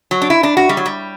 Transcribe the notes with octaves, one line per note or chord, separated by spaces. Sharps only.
F#3
D4
E4
D4
F#4
G3
F#3
G3